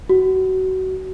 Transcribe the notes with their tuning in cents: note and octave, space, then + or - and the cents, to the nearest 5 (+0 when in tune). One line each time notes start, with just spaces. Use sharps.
F#4 +20